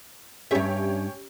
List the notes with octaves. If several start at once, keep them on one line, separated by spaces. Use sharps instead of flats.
G2 C#4 G4 C#5 E5